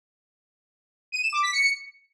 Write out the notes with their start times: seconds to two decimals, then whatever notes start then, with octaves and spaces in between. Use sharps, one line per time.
1.12 D#7
1.22 E7
1.32 D6
1.43 B6
1.53 C#7